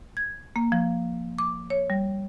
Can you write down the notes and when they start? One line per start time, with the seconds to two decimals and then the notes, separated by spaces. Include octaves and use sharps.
0.17 G#6
0.56 A#3
0.72 F3
1.39 D6
1.70 C#5
1.90 G3